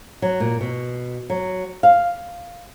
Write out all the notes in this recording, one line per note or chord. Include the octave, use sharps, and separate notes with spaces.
F#3
A#2
B2
F#3
F5